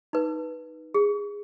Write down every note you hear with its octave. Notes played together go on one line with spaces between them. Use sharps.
D#4 B4
G#4